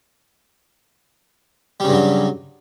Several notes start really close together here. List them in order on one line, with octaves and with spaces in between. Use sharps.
G3 C#3 G2 F#3